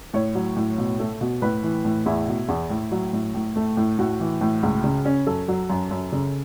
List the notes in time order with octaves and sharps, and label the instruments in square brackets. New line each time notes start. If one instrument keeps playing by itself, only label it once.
[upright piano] A2 C#5
F#3
A2
B2
A3
B2
A2 B4
E3
A2
E2 E4
B2
E2
A2
F#3
A2
A2
A3
A2
A2 F#4
E3
A2
C#2
C#3
C#4
F#2 A4
F#3
F#2
F#2
C#3